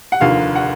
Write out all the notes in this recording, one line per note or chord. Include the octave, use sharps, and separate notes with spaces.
F#5
F1 D#2 D3 F3 F5
F#5